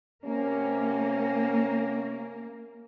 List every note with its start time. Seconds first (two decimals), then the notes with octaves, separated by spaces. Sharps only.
0.25 C3 A#3 C#4